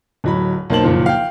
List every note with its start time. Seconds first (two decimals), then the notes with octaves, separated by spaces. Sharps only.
0.24 D1 F#3 B5
0.70 B1 A#3 C5 A5 F#7
0.83 F#1 A#2 D#3 F3
1.06 F5 G5